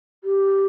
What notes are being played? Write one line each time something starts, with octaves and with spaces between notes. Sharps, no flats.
G4